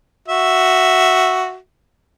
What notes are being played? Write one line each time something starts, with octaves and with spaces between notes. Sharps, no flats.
F#4 E5